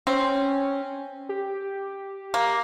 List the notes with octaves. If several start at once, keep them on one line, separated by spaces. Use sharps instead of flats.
C4 C#4
G4
A#3